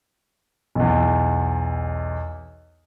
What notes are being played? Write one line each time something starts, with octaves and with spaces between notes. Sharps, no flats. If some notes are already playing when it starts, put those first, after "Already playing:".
B1 E2